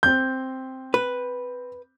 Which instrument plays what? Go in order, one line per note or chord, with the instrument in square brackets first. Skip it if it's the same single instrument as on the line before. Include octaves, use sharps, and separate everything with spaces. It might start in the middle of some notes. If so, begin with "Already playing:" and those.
[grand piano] C4 G6
[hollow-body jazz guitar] B4